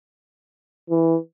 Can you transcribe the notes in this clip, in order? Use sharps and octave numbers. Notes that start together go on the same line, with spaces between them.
E3